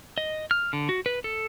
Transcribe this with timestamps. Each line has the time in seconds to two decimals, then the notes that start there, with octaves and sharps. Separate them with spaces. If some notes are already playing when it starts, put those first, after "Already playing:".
0.18 D#5
0.51 F6
0.73 D3
0.89 F#4
1.06 B4
1.24 A4